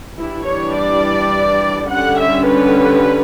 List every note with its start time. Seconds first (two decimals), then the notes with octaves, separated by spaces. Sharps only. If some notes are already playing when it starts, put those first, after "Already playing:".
0.18 E3 G3 D4 E4
0.46 C#5
0.76 D5
1.90 D3 G3 C#4 F#5
2.20 E5
2.48 B4